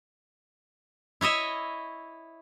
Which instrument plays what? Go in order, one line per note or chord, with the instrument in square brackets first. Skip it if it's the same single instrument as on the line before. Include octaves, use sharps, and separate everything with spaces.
[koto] E4 C#5 D#5 E5